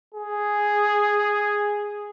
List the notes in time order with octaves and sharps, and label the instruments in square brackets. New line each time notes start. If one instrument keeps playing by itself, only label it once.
[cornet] G#4